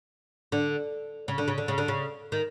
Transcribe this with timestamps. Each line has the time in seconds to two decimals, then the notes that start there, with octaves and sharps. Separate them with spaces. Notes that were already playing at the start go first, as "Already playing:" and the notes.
0.52 D3
1.28 C#3
1.38 D3
1.48 C#3
1.58 D3
1.68 C#3
1.78 D3
1.88 C#3
2.32 D#3